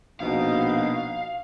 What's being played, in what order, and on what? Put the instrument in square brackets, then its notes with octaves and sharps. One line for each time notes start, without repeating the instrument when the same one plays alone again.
[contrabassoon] A#1 [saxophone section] B2 [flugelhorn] D#4 [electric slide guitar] F5